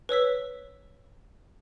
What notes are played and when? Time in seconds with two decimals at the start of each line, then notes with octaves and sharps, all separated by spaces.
0.09 B4 C#5 E6 B6